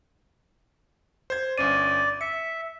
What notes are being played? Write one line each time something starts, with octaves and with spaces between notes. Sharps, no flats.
C5 G#6
G1 C#4 D5 D#7
E5 C#7